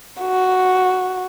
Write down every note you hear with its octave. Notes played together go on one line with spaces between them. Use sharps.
F#4